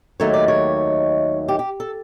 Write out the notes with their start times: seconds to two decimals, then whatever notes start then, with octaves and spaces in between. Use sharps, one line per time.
0.20 D#2 D#3 F#3 A3 C#5
0.33 D5
0.48 C#5
1.48 G4
1.59 G4
1.80 A4